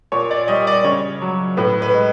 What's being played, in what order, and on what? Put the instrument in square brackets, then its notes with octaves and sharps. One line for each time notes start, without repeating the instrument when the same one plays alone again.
[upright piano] A#2 C#5
D5
G3 D#5
D5
C#3 C#5
F#3
A2 B4
B4
G#3